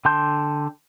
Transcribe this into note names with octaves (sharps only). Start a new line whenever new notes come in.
D3 G5 A5 C6 G6